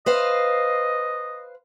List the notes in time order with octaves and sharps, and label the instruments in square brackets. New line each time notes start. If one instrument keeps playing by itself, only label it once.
[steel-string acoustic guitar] B4 C5 F5 [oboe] D#5